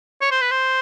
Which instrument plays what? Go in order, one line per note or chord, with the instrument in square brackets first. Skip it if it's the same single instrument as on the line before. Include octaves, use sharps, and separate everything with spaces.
[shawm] C#5
C5
B4
C5